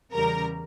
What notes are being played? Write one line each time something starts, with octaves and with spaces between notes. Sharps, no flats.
E2 C#3 G3 A#4 A#5